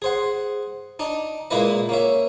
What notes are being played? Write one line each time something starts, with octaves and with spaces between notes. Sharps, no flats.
G#4 C5 F#5
D4 D#4
A#2 G#3 A#3 E4 B4 D#5
A#3 C#4 E5